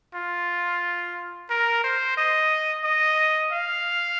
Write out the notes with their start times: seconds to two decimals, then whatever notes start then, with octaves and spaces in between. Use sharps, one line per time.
0.14 F4
1.50 A#4
1.84 C5
2.17 D#5
2.84 D#5
3.52 F5